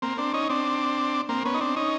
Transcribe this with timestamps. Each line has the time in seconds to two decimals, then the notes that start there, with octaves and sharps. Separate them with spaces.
0.02 A#3 C4
0.18 C4 D4
0.34 C#4 D#4
0.50 C4 D4
1.29 A#3 C4
1.45 B3 C#4
1.54 D#4
1.61 C4 D4
1.76 C#4 D#4